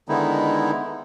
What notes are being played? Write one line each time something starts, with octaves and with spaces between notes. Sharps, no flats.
D3 D#3 G#3 B3 D#4 E4